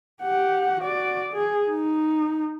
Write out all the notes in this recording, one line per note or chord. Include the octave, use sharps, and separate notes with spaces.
G4 F#5
F#4 D5
G#4
D#4